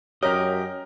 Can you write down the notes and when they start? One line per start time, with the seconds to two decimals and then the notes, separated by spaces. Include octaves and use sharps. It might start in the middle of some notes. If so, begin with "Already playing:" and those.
0.23 F#2 G4 A#4 C#5 D#5 F6